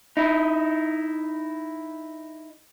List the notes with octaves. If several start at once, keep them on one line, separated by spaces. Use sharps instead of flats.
D#4 E4